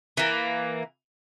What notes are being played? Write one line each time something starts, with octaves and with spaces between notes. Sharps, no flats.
E3 A#3